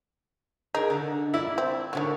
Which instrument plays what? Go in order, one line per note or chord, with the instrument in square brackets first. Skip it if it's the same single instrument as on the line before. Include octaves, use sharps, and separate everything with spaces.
[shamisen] D#4 [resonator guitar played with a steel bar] G#4 A#4
[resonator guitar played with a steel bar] D3
[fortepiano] E4 [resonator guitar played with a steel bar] D5
[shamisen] C4
[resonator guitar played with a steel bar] A2 D3 C#5 [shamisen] D#3 F#4